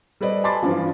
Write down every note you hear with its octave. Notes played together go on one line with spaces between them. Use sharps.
G3 A4 B4 C5 D5 D#5
G#5 A5 B5 C6 D6 A6
G2 E3 F3